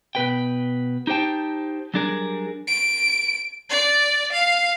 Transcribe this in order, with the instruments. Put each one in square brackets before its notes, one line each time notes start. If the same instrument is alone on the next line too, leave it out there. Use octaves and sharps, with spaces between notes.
[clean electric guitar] B2 B4 G5
D#4 G4 C5 G5 A5
F#3 G3 D4 G#4 A#4
[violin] D7
D5
F5